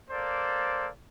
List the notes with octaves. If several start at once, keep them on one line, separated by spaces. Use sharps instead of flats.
A#3 A4 C5 D5